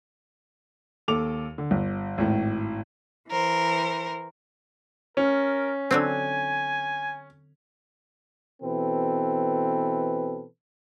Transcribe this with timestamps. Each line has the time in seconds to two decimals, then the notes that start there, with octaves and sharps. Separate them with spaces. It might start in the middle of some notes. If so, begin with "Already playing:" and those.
1.08 D#2 A4 D6 F7
1.58 D3
1.71 G1
2.18 G#1 A2
3.30 E3 A#4 C5
5.17 C#4 A#4
5.91 D3 F#3 C4 G#5
8.63 B2 E3 C4 A4 B4